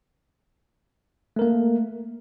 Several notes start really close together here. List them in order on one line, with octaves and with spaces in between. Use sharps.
A3 A#4 A#3